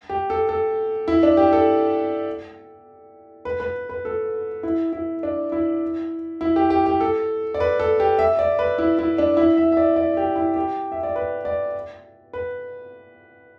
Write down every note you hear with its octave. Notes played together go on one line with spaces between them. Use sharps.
G4
A4
A4
E4
D4
G4
A4
B4
B4
B4
A4
E4
E4
D4
E4
E4
G4
G4
G4
A4
D5
B4
A4
G4
E5
D5
B4
E4
E4
D4
E4
E5
E5
D5
D5
G4
E4
G4
E5
D5
B4
D5
B4